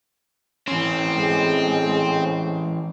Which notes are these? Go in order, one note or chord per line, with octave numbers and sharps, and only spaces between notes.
E3 C4 C#4
G#3